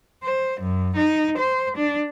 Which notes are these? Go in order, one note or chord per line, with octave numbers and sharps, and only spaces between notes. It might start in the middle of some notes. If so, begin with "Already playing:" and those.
C5
F#2
D#4
C5
D4